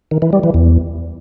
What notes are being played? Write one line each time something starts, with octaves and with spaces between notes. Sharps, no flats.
D#3
E3
G3
E3
E2